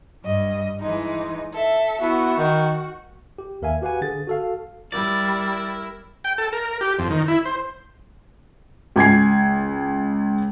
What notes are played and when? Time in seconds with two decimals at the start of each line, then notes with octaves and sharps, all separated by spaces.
0.23 G2 D#5
0.80 E3 G#3 D#4
1.54 A4 E5
2.02 B3 E4 F#4
2.38 D#3
3.38 G4
3.62 D#2 A#4 E5 F5 G#5
3.81 F#4 G4 B4 F5 F#5 G#5
4.01 D3 G#4 A6
4.27 F#4 A4 F5
4.92 G3 E4 A#4 D5
6.24 G5
6.38 A4
6.53 A#4
6.81 G4
6.99 F2
7.10 D#3
7.28 E4
7.45 C5
8.96 C#2 G#5 G#6 C7